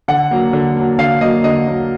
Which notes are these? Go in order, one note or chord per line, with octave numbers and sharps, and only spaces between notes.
D3 F#5
F#3 A#3
D3
F#3 A#3
D3 F5
F#3 A#3 D#5
D3 D#5
F#3 A#3